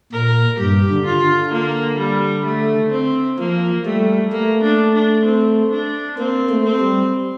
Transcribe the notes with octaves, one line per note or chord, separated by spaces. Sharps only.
A#2 A#4
G2 G4
D3
F4
D3
A#3
G3
A3
C4
F3 A#3
G3 A3
A3 A#3
D4
D4
C4
D4
A#3 C4
A3
C4
G3